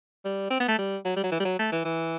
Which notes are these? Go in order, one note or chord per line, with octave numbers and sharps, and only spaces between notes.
G3
C4
B3
A3
G3
F#3
G3
F#3
E3
G3
F#3
A3
E3
E3